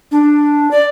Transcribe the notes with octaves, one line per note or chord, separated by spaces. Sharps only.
D4
D5